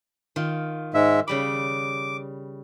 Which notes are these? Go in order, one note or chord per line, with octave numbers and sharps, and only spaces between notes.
D#3 F4
G#2 G#3 E5
C#3 G3 B5 D6